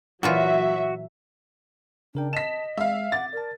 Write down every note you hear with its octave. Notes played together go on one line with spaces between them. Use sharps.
A#2 E3 F#3 F4 F#4 E5
C#3 D4 A#4 G5
D#5 A5 B6 E7
G#3 E5 F5
E5 F#5 D6 A6
A#4 D5 A5